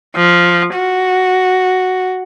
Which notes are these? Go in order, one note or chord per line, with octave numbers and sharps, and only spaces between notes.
F3
F#4